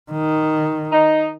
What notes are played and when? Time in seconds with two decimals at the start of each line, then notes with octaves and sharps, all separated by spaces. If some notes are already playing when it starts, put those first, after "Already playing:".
0.12 D#3
0.92 D#4